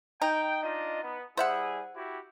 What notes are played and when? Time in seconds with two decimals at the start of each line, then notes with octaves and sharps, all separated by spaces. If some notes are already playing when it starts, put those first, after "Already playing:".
0.22 D#4 G5
0.63 D4 F4 D#5
1.03 B3
1.37 G3 E4 G#4 C5 E5 F#5
1.96 E4 F#4 G4